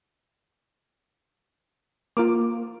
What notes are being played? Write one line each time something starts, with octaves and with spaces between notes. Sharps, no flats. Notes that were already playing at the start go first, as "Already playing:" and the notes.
A#3 F4 A#4 D6